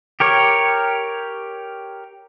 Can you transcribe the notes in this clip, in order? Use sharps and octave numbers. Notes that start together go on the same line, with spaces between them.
G4 A#4 C#5